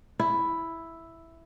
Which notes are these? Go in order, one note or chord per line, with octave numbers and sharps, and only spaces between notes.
E4